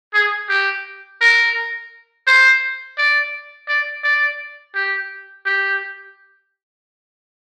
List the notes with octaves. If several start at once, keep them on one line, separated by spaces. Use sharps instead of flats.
G#4
G4
A#4
C5
D5
D5
D5
G4
G4